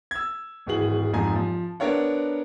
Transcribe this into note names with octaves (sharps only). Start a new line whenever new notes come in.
E6 G#6
D1 G#1 E3 F#4 G#4 F#7
F1 G#2 F3 G#5 A#5
F3
B3 D4 A#4 C#5 F#5